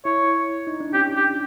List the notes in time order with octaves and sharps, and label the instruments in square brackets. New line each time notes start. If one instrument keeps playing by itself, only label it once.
[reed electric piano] E4 [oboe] C#5
[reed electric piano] D#4
D4
[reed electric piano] C#4 [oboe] G4
[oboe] G4